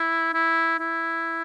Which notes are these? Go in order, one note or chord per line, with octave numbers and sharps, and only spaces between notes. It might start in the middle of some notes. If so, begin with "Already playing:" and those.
Already playing: E4
E4
E4